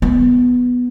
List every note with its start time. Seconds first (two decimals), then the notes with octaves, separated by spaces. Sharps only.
0.02 B3